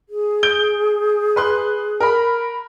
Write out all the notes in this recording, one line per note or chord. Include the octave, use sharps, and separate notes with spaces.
G#4
G6 D7 G7
B4 C6 F#6
A#4 B5